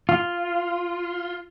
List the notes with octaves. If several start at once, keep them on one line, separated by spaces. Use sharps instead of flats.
F4